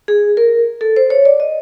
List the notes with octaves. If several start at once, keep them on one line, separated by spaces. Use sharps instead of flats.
G#4
A#4
A4
C5
C#5
D5
D#5